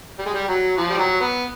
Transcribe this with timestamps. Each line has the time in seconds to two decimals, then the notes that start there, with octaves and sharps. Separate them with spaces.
0.18 G3
0.26 G#3
0.34 G3
0.48 F#3
0.77 F3
0.90 G3
0.99 F#3
1.20 B3